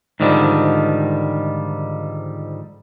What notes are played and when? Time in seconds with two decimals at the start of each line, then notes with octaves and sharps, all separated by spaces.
0.20 G#2 D3 D#3 F3 G3